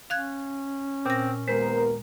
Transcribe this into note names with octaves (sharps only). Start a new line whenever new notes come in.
C#4 F5 F#6 G#6
A#2 C4 A#6
D#2 G#3 B3 A#4 C5